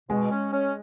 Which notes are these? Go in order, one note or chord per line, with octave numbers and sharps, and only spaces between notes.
B2 G#3
C#4
C#4